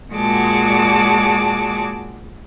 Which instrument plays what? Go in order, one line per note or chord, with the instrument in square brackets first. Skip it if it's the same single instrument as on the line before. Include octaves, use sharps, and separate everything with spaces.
[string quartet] A#2 G#3 F#4 G#4 A5 D6